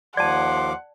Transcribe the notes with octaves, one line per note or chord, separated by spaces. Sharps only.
D#2 F3 D5 F#5 A5 C6 D6